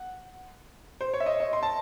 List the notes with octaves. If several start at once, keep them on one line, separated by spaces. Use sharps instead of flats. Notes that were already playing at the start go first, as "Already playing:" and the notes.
Already playing: F#5
C5
C#5
E5
D#5
D#5
C6
A5